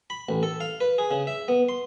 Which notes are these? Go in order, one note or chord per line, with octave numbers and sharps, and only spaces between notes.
B5
A1
A4
F5
B4
G#4
C#3
E5
B3
C6